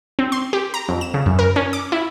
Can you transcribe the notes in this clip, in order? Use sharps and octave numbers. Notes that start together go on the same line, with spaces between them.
C4
C6
G4
A#5
F2
E7
C#3
F#2
A#4
C#4
D6
E4